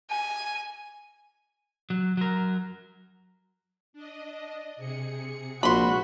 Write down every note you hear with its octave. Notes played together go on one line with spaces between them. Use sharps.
G#5
F#3
F#3 A#4
D4 D#5
C3 G#4 C#7
A#1 A#2 G#3 F#4 B5 C6